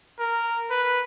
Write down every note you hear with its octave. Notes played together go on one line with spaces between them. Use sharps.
A#4
B4